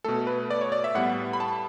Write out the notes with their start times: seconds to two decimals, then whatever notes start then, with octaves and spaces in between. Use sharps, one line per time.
0.04 B2 A3 A4
0.27 B4
0.51 D5
0.61 C#5
0.72 D5
0.84 E5
0.95 A2 G3 B3 F#5
1.33 B5
1.40 A5